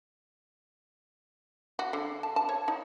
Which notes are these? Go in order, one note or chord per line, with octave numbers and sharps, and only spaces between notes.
F#4
D3
A5
A5
C#5
D#4